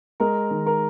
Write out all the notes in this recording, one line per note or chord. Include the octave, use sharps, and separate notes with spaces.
G#3 A#4 A#5
D#3
A#4 A#5